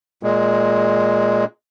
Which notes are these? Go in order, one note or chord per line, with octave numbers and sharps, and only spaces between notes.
A#2 G#3